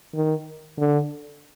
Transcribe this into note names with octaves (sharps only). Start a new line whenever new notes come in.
D#3
D3